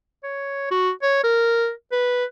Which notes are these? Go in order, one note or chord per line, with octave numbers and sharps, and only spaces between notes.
C#5
F#4
C#5
A#4
B4